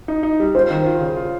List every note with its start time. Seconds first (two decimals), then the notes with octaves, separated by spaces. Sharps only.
0.08 D#4
0.23 D#4
0.40 G3
0.55 F4 C5
0.70 D#3
0.86 F4
1.01 C#3
1.16 F4